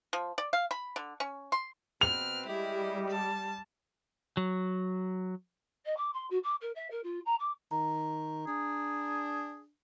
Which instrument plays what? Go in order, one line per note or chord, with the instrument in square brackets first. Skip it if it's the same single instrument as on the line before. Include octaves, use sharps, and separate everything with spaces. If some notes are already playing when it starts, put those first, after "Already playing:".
[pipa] F3
D5
F5
B5
D3
C#4
C6
[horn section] B2 C4 B4 [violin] F6 [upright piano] F7
[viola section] G3 [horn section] G#3 G4 D#5 [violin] E4
[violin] A5
[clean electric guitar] F#3
[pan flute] D#5
D6
C6
F#4
D6
A#4
E5
A#4
F4
A#5
D6
[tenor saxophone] D#3 [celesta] A#5
[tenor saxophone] D4 [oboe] G#4